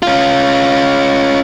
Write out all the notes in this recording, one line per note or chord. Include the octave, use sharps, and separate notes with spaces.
C#4 F4